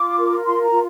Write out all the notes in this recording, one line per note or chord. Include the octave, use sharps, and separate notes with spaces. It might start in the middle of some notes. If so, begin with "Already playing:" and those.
Already playing: F4 D6
A#4
F4 C6
A#5
F4